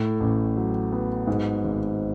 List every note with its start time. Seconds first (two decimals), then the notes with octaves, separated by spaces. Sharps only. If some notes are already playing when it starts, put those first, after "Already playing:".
Already playing: A2
0.21 A1
0.57 F#3
0.92 B3
1.27 G#2
1.64 G#1